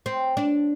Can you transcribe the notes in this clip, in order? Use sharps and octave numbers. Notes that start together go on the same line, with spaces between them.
C4
D4